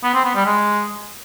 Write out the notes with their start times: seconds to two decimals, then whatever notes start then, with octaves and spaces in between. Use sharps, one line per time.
0.03 B3
0.14 C4
0.24 B3
0.35 G3
0.46 G#3